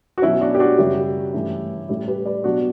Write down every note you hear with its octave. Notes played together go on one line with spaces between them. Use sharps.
F#4
B2 F#3 C#4 E4
D4 F#4
G4
D4 F#4
F#2 C#3 G3 E4 G4
G2 E3 A3 C#4
A2 G3 C#4 E4
G4 B4
B4 D5
B2 F#3 B3 D4 F#4